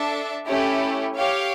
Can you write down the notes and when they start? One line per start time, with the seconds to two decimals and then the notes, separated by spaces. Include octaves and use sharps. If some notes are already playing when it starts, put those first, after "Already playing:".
Already playing: D4 A4 E5 A5
0.46 A3 C#4 E4 G4 C#5
1.17 G4 C#5 F5